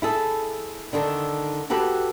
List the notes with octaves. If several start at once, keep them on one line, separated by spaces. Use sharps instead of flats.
E4 G#4 A4
D3 D#3 A4
F#4 G4 A4 B4